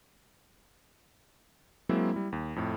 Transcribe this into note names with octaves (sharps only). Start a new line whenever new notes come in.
F#3 G#3 A#3 C4 E4
G3 E4
D#2
F2 A2